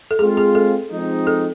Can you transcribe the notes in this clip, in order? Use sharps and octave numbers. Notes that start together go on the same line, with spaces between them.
A4
G#3 C4 F4 G#4
G#4
A4
F3 G#3 C4 D#4
A4